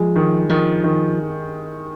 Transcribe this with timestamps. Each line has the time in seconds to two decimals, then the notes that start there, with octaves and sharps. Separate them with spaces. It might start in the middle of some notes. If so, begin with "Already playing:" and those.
Already playing: F3 G#3
0.16 D#3
0.49 D#3 F3
0.84 D#3